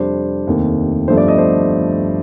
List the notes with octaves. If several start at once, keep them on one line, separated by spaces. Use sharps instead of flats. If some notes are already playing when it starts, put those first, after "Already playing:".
Already playing: F2 C3 G3 D4 C5
F1 D#2 D#3 A3 C4
G1 G2 F3 A3 D4 C5
D5
D#5
C5